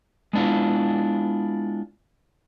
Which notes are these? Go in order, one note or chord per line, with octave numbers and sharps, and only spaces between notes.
G#3 B3 D4 E4 F4